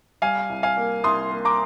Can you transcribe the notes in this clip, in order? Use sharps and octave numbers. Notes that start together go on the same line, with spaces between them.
G3 F5 G#5
C2
F5 G#5
A#3
C2 C6 D#6
A#3
A#5 D6